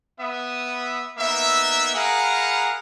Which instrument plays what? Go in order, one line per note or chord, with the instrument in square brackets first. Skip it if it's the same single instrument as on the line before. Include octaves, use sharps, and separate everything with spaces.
[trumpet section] B3 E5 D#6
A#3 B3 D#4 E5
G#4 A#4 F5 F#5 A#5 B5